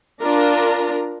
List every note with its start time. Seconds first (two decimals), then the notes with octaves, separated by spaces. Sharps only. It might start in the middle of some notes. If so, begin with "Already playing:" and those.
0.21 D4 F4 A#4 A#5